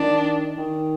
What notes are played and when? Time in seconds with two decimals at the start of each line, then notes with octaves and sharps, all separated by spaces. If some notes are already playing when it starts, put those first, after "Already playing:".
Already playing: D#3 D4
0.58 D#3